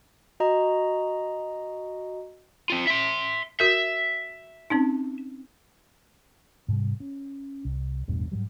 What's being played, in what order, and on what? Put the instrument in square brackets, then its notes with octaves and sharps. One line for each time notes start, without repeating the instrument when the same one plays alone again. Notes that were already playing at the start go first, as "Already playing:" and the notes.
[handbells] F#4 D#5 A#5
[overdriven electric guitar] C4 F4
E5 C6
[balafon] F#4 A#4 [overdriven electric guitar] E5
[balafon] C4 C#4 D#4
[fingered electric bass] G#2 C3 G3
C#4
C2
A1 E2 G2 B2
G#2 F#3 G3